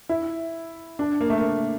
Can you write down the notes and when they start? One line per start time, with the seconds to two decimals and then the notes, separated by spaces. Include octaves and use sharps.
0.09 E4
0.99 D4
1.21 A#3
1.30 A3
1.37 A#3